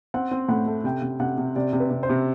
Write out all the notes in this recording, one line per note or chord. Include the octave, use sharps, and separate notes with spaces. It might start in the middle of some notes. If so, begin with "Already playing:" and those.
C4 F#5
C4
A2 F#5
A3
C3 G5
C3
C3 F#5
C3
C3 D5
C3
B4
C3
C5
C3